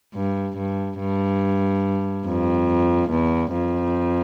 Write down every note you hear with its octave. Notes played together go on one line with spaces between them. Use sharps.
G2
G2
G2
F2
E2
F2